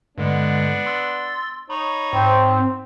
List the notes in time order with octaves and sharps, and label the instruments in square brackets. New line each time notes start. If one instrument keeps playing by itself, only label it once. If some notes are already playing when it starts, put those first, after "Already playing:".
[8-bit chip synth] G2 D3 G#3 [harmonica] B3 D4
[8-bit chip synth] C6 E6 A6
[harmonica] D#4 C#5 [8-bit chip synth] B5
[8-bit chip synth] G#2 [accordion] C4